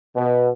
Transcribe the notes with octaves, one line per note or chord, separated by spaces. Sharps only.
B2